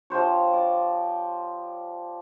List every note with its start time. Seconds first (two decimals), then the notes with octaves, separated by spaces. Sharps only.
0.10 F3 G4 C5 C#5
0.53 D5